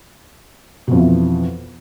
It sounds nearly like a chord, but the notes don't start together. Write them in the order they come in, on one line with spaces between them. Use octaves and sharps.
B2 F2 F3 E3